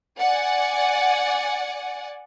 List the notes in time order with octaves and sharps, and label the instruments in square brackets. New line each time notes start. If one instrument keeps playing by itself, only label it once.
[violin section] D5 F#5 G#5